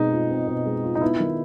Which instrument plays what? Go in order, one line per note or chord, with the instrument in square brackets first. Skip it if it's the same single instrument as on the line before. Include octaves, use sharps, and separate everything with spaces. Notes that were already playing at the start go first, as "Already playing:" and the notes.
Already playing: [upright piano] B2 G#3 C4 [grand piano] D#4
[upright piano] F4
C4
B2
G#3
F4
[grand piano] D#4
[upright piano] B3 [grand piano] E4
[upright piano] D#3